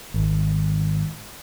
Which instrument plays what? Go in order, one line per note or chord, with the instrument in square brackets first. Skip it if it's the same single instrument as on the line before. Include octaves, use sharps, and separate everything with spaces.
[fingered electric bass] G#1